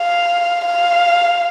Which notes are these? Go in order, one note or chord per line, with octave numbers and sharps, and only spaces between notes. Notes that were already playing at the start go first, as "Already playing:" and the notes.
Already playing: F5
F5